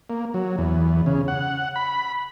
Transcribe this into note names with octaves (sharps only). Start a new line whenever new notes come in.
A#3
F#3
E2
C#3
F#5
B5